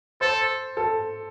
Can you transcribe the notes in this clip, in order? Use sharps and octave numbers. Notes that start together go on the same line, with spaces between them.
A4 C5
A4